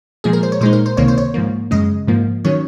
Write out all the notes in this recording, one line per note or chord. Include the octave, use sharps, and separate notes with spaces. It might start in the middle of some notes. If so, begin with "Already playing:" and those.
A#2 F3 G#3 G#4
A#4
C5
C#5
A#2 G#3 D#4 C5
A#4
C5
C#2 C3 D#3 A#3 C#5
C5
C#5
G#2 F3 A#3
F#2 C#3 G#3 D#5
G#2 F3 A#3
D#3 F#3 C#4 C#5